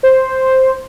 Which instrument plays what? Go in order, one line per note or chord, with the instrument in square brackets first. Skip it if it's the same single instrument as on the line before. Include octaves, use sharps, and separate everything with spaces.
[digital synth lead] C5